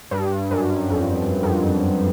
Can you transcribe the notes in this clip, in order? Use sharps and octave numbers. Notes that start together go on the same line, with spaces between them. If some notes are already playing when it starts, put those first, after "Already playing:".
G2
F#2
F2
F2